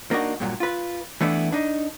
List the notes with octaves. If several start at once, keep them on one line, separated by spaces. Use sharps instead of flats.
A#3 D4 D#4 F#4
G2 A#2 F#3
F4 B4
E3 A3 B3 D4 E4
D4 D#4